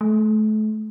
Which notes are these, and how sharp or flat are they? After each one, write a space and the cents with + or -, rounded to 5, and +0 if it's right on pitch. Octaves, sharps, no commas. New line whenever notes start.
A3 -35